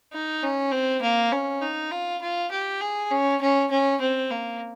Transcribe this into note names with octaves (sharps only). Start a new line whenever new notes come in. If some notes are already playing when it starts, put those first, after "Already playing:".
D#4
C#4
C4
A#3
C#4
D#4
F4
F4
G4
G#4
C#4
C#4
C#4
C4
A#3